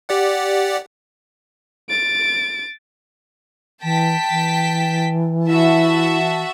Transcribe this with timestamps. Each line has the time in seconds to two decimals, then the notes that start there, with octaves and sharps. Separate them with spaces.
0.09 G4 D5 F#5
1.89 A6 D7
3.83 E3 G5 A5 B6
4.31 E3
5.47 E4 F#4 E5 A5